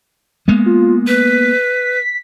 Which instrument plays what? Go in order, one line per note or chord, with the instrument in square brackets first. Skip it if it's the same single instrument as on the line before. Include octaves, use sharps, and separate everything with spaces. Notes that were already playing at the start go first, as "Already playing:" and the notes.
[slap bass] G#3 A#3 B3
[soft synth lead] F4
[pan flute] B4 [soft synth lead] B6